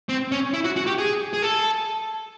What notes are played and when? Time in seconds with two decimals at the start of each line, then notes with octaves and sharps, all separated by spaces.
0.09 C4
0.32 C#4
0.54 E4
0.65 F#4
0.76 F#4
0.87 G4
0.98 G#4
1.34 G#4
1.42 A4